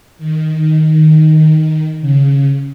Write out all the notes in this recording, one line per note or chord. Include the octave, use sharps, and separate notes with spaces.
D#3
C#3